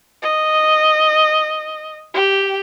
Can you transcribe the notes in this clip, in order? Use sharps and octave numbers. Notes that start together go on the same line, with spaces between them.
D#5
G4